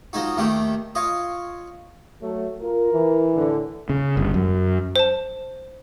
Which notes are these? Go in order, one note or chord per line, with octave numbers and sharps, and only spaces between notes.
F3 G#3 D#4 F#4
D#2 D#3 A3 G4
F4 C#5 D#5
F#3 A3
F4 A#4
E3
A2 D3
C#3
G1
F#2
C5 A5